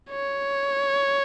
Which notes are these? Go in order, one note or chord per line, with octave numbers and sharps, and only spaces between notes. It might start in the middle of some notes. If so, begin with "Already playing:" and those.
C#5